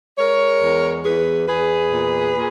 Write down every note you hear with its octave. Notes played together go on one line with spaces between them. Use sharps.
G#3 A#4 C#5
E2
E2 G#4 B4
E2 G#4 B4
A#2
A#2